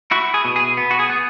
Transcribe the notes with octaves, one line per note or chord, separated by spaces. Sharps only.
E4 F#4
G#4
B2
G#4
B3
F#4
G#4
B3